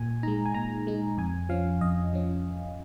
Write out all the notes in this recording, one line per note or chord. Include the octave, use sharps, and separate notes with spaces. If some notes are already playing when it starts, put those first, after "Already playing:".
Already playing: A#2 G#5
G#3 D#4 A#5
G#5
A#2 A#5
G#3 D#4
F2 G#5
F3 C#4 F5
F2 D#5
F3 C#4